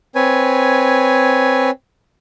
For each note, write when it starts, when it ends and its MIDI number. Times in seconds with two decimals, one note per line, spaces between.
0.15 1.70 60
0.15 1.70 71
0.15 1.70 73
0.15 1.70 80